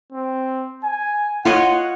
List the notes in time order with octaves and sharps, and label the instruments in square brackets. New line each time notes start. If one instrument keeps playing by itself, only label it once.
[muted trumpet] C4
G#5
[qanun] F4 C#5 D#5 [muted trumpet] F#5